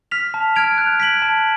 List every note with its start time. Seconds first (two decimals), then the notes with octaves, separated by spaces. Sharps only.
0.11 F6 B6 F7
0.34 A5
0.56 F6 G#6 D7 F7
0.78 F#6
1.00 B6 D7 F#7
1.22 A5